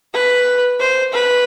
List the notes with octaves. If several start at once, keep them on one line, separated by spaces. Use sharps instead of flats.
B4
C5
B4